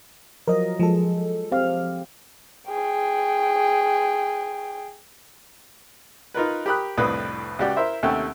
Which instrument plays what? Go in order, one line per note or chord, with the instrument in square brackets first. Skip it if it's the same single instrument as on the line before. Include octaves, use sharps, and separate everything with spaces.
[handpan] F3 F#3 D#5 [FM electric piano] A#4
[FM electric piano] F3 A4 [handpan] G#3
[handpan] C4 G4 F5
[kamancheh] G#4 G5
[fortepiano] D#4 F4 A#4 B4
G4 A#4 B5 D#6 F#6
C2 F2 A2 D4 B4 D#6
C#2 F#4 G4 D5 G5
E4 A#4 C5 E5
D#2 C3 A3 C#4 F#5 G5